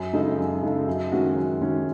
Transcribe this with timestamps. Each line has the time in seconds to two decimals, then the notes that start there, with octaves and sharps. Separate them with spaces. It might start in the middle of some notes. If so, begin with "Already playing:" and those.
Already playing: F#2
0.13 C#3 G#3 D#4 A4
0.38 F#2
0.63 C#3 G#3 D#4 A4
0.87 F#2
1.12 D#3 G#3 C#4 F#4
1.36 F#2
1.61 D#3 G#3 C#4 F#4